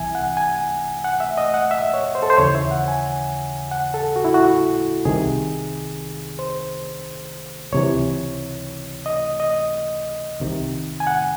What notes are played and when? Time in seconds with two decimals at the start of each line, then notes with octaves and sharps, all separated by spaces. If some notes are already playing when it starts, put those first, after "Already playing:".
Already playing: C2 C3 E3 E5 G#5
0.15 F#5
0.37 G#5
1.04 F#5
1.20 E5
1.38 D#5
1.54 F#5
1.71 E5
1.94 C#5
2.15 C5
2.23 A4
2.30 C5
2.37 D#2 C#3 E3 C#5
2.55 E5
2.71 F#5
2.88 G#5
3.71 F#5
3.94 A4
4.16 F#4
4.25 E4
4.34 F#4
5.05 C2 C3 D#3 G#4
6.39 C5
7.72 C#2 C3 E3 C#5
9.06 D#5
9.40 D#5
10.40 C2 C3 D#3
11.00 G#5
11.07 F#5